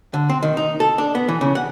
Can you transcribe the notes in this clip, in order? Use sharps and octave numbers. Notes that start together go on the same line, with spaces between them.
D3
C4
D#3
D#4
A4
D4
B3
E3
C#3
F#5